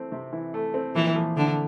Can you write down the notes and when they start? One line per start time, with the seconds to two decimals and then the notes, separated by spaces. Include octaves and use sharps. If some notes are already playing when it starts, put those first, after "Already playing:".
Already playing: E3 A3 C4
0.12 C3
0.33 E3
0.54 A3
0.74 C4
0.95 A#2 E3
1.16 F3
1.37 D3 A3